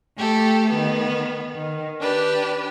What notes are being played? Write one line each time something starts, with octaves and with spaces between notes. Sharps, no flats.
A3 G4 A4
D#3 B3
D#3
D4 G4 B4